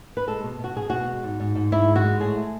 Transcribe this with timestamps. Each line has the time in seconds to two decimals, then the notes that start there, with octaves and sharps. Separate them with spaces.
0.17 B4
0.27 G#3 A4
0.44 B2
0.59 B2
0.64 F#4
0.76 B2 G#4
0.90 B2 F#4
1.07 G#3
1.23 G#2
1.40 G#2
1.55 G#2
1.72 G#2 E4
1.88 G#3
1.96 F#4
2.04 G#3
2.20 A2 G#4
2.36 A3